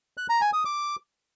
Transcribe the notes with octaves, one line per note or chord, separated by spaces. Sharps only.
F#6
A#5
G#5
D#6
D6